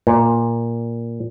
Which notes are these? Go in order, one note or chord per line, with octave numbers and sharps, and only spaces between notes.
A#2